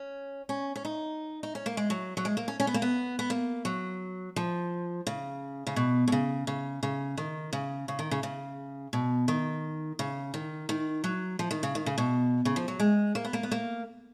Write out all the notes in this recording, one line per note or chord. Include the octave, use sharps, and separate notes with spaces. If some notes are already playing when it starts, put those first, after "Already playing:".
Already playing: C#4
C#4
C#4
D#4
D#4
C#4
A#3
G#3
F#3
F#3
G#3
A#3
C#4
C#4
B3
A#3
B3
B3
A#3
F#3
F3
C#3
C#3
B2
B2
C#3
C#3
C#3
D#3
C#3
C#3
D#3
C#3
C#3
B2
D#3
C#3
D#3
D#3
F#3
F3
D#3
C#3
D#3
C#3
B2
C#3
F3
F#3
G#3
A#3
B3
A#3
B3
A#3